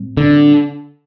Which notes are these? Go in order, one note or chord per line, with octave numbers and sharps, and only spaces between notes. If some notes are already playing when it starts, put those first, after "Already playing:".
Already playing: A2 G3 C4
D3